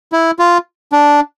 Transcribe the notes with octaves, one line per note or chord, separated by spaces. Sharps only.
E4
F4
D4